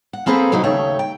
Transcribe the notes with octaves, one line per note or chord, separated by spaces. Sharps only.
F#5
A#3 C4 G#4 A4 B4 C5
C3 F#3 G#3 D#4 E4 F#4
D#2 C#3 A3 C#5 E5 G5
G5